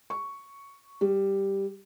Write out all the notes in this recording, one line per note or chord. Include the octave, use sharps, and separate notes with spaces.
C#6
G3